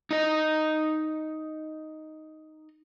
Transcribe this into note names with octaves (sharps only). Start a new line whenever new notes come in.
D#4 D#5